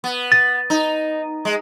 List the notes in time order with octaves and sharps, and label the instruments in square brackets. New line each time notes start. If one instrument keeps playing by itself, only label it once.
[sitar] B3
[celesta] A6
[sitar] D#4
G#3